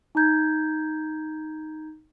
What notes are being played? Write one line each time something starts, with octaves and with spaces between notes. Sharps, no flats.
D#4 A#5 G6 G#6